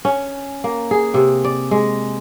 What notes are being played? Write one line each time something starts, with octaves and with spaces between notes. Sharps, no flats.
C#4
A#3
G#4
C3
D5
G#3